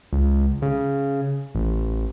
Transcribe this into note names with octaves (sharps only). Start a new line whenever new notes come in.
C#2
C#3
A1